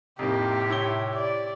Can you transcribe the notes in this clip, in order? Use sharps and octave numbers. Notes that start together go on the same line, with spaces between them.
F2 A2 C3 D#3 A#3 G4
E4 C#5 G7
D5